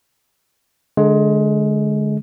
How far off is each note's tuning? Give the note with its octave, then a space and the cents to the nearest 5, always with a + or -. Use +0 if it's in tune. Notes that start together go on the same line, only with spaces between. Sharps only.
D3 +0 G#3 +20